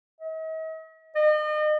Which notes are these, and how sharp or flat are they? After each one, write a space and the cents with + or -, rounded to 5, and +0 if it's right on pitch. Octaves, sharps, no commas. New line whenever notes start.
D#5 +45
D#5 -40